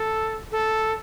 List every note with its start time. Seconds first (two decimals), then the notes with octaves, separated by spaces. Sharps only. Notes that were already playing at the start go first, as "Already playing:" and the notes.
Already playing: A4
0.52 A4